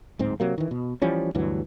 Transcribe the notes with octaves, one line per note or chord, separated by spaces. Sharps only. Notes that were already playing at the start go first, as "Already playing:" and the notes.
D1 G#2 C4
C3 F#3 A#3
D#3 E3
B2
E3 F3 G3 C#4
D2 G2 E3 F#3